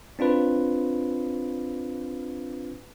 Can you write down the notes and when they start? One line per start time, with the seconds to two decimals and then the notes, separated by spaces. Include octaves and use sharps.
0.19 C4 D4 F4 B4